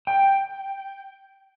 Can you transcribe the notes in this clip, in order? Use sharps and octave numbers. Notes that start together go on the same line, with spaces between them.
G5